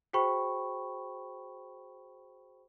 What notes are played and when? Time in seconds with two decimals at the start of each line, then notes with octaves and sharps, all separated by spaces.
0.13 F#4 G#4 C5 G5 B5 C#6